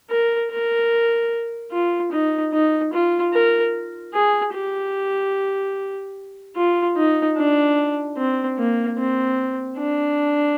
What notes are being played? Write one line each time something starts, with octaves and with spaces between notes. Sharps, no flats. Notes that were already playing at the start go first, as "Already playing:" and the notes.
A#4
A#4
F4
D#4
D#4
F4
A#4
G#4
G4
F4
D#4
D4
C4
A#3
C4
D4